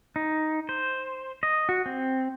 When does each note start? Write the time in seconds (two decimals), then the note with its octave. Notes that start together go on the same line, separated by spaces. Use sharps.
0.16 D#4
0.69 C5
1.43 D#5
1.69 F#4
1.86 C4